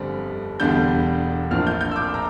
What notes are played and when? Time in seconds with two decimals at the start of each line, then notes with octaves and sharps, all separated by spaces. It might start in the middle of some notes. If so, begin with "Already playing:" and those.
Already playing: G1 F2 D3 G3 C4
0.60 E1 E2 D3 G3 D4 G6
1.51 A#1 A2 F3 A#3 D4 F6
1.67 G6
1.81 G6
1.91 E6
1.96 D6
2.14 A#5